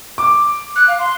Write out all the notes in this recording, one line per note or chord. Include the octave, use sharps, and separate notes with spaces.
D6
F#6
F5
C6